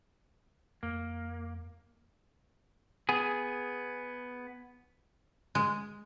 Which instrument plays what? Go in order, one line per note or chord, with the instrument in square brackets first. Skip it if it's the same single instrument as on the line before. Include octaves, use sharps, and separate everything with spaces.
[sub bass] F2 [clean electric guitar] A#3
[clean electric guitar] B3 G#4
[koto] G#3